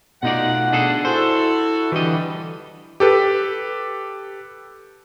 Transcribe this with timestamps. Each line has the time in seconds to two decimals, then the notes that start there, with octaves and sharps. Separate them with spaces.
0.23 B2 A3 D#4 F4 D5 F#5
0.72 D4 G#4 A4
1.05 E4 F#4 A4 C5
1.92 D3 E3 G3 D#5
3.00 G4 A4 B4